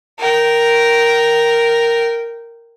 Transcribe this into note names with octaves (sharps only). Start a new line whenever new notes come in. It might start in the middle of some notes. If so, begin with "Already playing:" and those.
A#4 G5